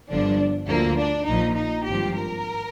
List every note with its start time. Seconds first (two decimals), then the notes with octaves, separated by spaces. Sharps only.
0.09 G1 G2 D3 F3 D4
0.68 D2 D3 F3 A#3
0.97 D4
1.27 A#1 A#2 F3 D#4
1.56 D#4
1.85 G#1 G2 F3 G4
2.15 A#4